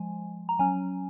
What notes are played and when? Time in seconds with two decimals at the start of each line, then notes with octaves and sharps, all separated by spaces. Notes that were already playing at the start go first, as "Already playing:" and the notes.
Already playing: F3 G#3 G#5
0.49 A#5
0.59 F#3 C#4 G#5